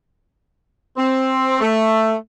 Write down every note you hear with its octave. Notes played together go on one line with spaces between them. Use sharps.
C4
A3